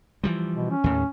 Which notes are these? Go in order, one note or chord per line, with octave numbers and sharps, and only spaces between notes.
E3 F3 G3
B2
C#4
D#2 A2